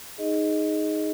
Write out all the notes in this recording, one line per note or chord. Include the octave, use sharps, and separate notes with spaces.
D#4 G#4 D#5